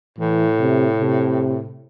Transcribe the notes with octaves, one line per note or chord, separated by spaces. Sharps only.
A2 E3
C3
C3